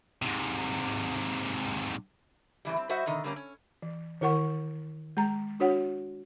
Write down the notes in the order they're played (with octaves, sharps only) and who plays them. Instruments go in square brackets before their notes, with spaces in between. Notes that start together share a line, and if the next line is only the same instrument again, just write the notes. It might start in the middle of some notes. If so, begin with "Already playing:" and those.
[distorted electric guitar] G#2 C3
[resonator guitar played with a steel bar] A2 C#3 E3 G3
G3 C4
G3 F#4 C5 D#5 E5 F#5
B2 D3 D#3 D#5
G2 D3 G3 A#3 C4 C#4
C#4
[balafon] E3
D#3 E4 A#4 F#5 C#6
G#3 A#5
D4 F#4 C#5 F#5